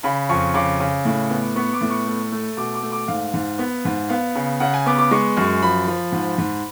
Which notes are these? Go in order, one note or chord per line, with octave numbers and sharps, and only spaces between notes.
C#3 B5
F2 C#6
C#3 D6
C#3
A2
B3
B3 C#6
D6
A2
C#6
A3
A3
B2 D6
D6
A3
D6
G#2 F5
G#2
B3
G#2
B3 F5
C#3
C#3 F#5
G#5
B3 D6
D6
G#3 C#6
F#2 C#6
F3 B5
F3
G#2
G#2